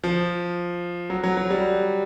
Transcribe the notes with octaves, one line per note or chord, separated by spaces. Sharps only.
F3
F#3
F#3
F#3
G3